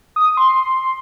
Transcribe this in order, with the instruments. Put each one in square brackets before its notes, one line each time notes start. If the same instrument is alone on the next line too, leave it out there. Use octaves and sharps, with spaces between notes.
[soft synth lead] D#6
C6